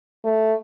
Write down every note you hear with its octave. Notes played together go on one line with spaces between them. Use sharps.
A3